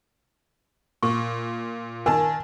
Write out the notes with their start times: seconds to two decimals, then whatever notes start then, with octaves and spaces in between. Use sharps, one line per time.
1.03 A#2 C#6
2.06 D#3 A#4 G#5 A5